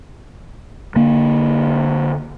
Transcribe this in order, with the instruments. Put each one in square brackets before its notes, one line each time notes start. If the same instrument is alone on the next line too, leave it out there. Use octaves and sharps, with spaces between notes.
[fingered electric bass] D3 A#3